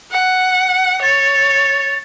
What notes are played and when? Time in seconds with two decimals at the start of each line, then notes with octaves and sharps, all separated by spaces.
0.11 F#5
1.02 C#5 A6